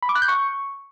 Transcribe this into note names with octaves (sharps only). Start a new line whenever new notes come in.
B5
D6
F#6
G6
C#6